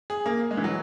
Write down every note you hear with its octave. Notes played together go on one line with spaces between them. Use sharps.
G#4
A#3
G#3
E3
F#3